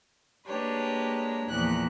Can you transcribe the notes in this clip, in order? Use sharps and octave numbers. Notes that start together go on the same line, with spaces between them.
G#3 A#3 D4 G4 B4 C#5
E2 A#2 F3 F#6